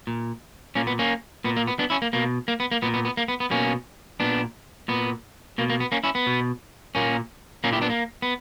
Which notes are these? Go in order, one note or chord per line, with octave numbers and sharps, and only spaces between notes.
A#2
A#2 A#3 C#4
B3
A#3 C#4
A#2 B3
A#3
B3
B3 D4
C#4 E4
A#3
B2 A#3
A#3
B3
A#3
A#2 B3
B3
B3
A#3
B3
B3
B2 A#3 C#4
A#2 B3 D4
A#2 B3
B2 A#3
A#3
B3
A#3 C#4
C#4 E4
B3
B2
A#2 A#3 C#4
A#2 A#3 C#4
E4 G4
B3 D4
A#3
B3